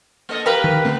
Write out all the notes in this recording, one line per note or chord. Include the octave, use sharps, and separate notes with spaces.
A#3 A4 D#5
G4 A#4 B4 F5
D#3
D3 A3 B3 C4